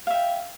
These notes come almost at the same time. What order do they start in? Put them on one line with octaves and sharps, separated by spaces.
F5 E5 G5